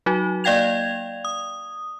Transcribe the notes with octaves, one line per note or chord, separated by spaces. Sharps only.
F#3 D#4 F#4
A#3 D5 F5 G5 G#6 F7
D#6